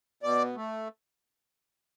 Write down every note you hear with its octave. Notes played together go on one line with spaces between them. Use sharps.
B2 D5
A3